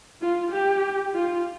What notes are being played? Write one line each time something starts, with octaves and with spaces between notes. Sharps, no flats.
F4
G4
F4